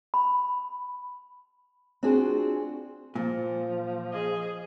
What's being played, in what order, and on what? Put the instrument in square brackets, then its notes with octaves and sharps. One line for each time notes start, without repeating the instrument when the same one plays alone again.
[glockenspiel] B5
[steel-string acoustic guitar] C4 D4 F4 F#4 G#4 C5
[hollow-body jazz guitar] A#2 [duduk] F3
[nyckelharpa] G#4 D#5